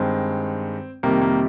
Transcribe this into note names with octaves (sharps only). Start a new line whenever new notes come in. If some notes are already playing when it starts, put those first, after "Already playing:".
Already playing: G2 D#3 G#3 C4
F2 C3 D#3 G3 A#3
A#3